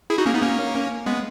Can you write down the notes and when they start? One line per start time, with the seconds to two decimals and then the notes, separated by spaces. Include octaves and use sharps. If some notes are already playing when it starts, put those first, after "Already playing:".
0.10 E4 G#4
0.18 D#4 F#4
0.26 A#3 C#4
0.34 B3 D#4
0.42 A#3 C#4
1.06 G#3 B3